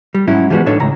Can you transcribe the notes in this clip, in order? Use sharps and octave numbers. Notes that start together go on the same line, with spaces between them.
G3
G#2 F#3 C#4 E4
E3 F3 G3 G#3 B3 F#4
A2 D4 D#4 A4 C#5
C#2 A2 A#5